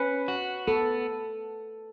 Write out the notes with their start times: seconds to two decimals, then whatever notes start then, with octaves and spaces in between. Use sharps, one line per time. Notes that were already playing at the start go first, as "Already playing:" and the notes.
Already playing: C#4 B4
0.28 F#4
0.67 B3 A4